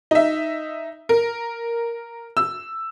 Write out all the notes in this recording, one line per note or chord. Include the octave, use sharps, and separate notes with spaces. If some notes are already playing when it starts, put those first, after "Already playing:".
D#4 E5
A#4
E6